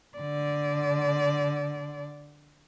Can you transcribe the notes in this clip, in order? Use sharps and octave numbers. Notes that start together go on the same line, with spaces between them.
D3 D5